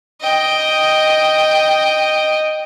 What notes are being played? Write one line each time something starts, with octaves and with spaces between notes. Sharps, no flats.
D#5 G5